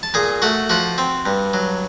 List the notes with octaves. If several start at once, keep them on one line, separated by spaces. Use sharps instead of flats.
A5
A#2 G#4 G#5
A3 F#4 F#5
F3 F#4 F#5
C4
G2
F#3